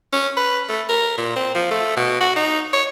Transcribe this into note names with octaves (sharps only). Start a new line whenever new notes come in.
C#4
B4
A3
A#4
A#2
C4
F3
A3
B2
F#4
D#4
C#5